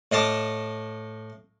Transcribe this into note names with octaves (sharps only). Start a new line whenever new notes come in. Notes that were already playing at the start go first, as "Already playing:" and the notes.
A2 D#5 F5 A5 D6